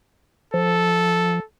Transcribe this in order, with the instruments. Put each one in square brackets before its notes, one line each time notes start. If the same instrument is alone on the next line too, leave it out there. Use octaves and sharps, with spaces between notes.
[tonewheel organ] F3 [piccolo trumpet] A4